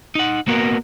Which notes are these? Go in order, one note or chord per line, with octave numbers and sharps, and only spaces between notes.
D#4 F#5
A#3 B3 F#4 A#4